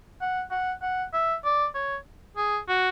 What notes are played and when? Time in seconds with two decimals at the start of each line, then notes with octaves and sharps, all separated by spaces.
0.21 F#5
0.51 F#5
0.82 F#5
1.13 E5
1.45 D5
1.75 C#5
2.37 G#4
2.68 F#4